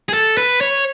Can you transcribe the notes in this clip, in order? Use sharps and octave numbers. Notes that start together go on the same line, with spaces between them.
G#4
A4
B4
C#5